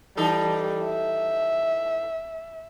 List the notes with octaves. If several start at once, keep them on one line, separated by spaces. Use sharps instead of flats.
E3 G3 D#4 A4
E5